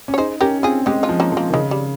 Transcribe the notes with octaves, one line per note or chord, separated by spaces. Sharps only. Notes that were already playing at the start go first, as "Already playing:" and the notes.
C#4
C#5
D#4 G#4 C5
C#4 G4 A#4
C4 F4 G#4
G#3 D#4 G4
C#4 F4
F3
A#3 C#4
F3
A#3
D#3
C#3 G#3
G3